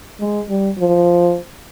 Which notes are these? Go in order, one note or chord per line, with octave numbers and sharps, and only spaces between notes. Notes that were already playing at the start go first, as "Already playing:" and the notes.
G#3
G3
F3